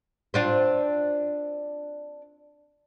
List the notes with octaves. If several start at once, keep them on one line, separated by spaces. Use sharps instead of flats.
C4 D4 F4